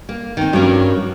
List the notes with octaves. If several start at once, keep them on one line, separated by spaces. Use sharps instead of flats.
A#3
D#3 C4
G2 F#3 C#4 A#4